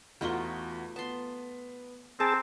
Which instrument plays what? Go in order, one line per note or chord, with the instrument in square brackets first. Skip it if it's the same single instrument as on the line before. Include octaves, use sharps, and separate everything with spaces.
[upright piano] E2 F#4 G7 [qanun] A3 D#4 F4
[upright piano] B3 [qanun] A5 C6
[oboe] C4 [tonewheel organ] G#4 A5 [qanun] A#4